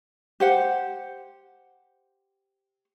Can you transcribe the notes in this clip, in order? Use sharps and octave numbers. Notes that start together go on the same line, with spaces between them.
G4 C5 F#5